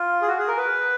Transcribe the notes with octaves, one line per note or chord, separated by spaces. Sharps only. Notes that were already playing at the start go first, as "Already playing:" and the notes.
Already playing: F4
G#4
F#4
G#4
A#4
B4